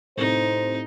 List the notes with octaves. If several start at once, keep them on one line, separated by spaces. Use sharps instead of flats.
C2 A2 D#4 C5